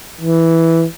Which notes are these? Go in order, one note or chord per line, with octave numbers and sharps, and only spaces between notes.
E3